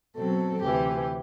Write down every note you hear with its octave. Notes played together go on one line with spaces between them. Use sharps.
B2 F#3 C4 A4
D2 C3 E3 G4